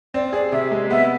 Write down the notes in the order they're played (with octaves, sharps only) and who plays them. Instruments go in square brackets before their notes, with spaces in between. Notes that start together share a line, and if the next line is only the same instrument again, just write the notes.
[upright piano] C4 [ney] D5
[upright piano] G#4 [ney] D5
[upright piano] C3 [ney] E5
[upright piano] G#3
[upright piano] B3 [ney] E5